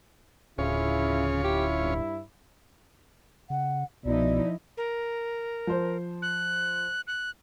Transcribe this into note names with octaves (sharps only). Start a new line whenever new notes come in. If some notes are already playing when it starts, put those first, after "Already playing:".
D1 C#3 C#4 E4 F4 C#5
E4 G4
G2
C#3 F#5
C2 B2 F3 D#4 E4 D5
A#4
F3 C5
F#6
F#6